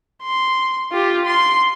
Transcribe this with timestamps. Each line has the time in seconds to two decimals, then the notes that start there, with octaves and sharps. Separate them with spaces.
0.23 C6
0.92 F4 G4
1.25 C6